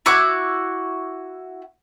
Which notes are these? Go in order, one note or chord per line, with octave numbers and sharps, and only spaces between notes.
E4 F#4 D6 F#6